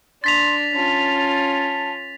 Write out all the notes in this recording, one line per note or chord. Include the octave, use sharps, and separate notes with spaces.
D4 C6 A6 B6 F7
C#4 F4 A5